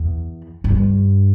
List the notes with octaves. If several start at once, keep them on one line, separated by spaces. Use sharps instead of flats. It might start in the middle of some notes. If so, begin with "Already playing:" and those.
Already playing: E2
G2